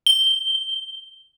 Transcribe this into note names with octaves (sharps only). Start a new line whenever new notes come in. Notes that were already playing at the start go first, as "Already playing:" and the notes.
G7